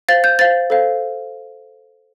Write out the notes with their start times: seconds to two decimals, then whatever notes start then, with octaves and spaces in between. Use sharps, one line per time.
0.08 C5 F5 A6
0.24 G6
0.39 C5 F5 A6
0.70 A4 C5 F5